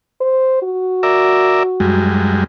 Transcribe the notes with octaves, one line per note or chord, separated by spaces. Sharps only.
C5
F#4
A#4 D5 E5
F#2 G3 G#3